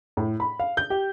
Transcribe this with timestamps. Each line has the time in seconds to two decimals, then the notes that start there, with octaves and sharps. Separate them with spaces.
0.17 A2
0.40 B5
0.60 F5
0.77 G6
0.90 G4